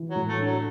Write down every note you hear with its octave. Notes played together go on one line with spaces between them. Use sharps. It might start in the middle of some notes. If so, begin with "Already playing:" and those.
Already playing: E3
F#3
A2
A3
D4
F#3